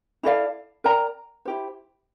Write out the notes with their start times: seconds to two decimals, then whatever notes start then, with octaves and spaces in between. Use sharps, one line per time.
0.23 E4 A4 D5 F5
0.84 A#4 D5 G5 A#5
1.45 E4 G4 C5